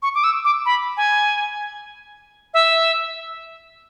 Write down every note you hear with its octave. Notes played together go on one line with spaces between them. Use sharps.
C#6
D6
E6
D6
B5
G#5
E5